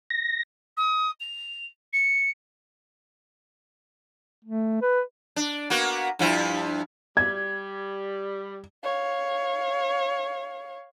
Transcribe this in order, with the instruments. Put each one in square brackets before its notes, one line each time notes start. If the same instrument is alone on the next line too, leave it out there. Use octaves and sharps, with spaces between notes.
[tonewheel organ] A#6
[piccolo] D#6
F7
C#7
[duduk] A3
B4
[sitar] D4
A#3 B3 F#4
G2 F3 E4
[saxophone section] G3 [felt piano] G#6
[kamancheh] C#5 F5